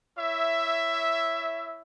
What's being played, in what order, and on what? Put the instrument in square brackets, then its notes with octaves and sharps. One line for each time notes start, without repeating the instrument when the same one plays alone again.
[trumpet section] E4 C#5 E5